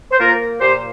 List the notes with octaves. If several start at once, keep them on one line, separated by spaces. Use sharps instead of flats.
C5
A#3 F4 A#4
A#2 G4 C5